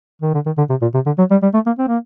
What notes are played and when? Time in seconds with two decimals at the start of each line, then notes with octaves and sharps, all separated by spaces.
0.21 D#3
0.34 D3
0.46 D#3
0.57 D3
0.70 C3
0.81 A#2
0.94 C3
1.06 D3
1.18 F#3
1.31 G3
1.42 G3
1.54 A3
1.66 A#3
1.78 C4
1.87 A#3